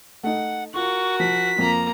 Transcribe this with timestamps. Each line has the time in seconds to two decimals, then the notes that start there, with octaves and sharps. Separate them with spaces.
0.23 A3 D#4 F#5
0.74 F4 F#4 A#4 C#6
1.20 F3 B6
1.59 F2 A#3 A#5